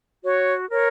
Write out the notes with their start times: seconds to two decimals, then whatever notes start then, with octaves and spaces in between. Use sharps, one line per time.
0.23 F#4 C#5
0.69 A#4 C#5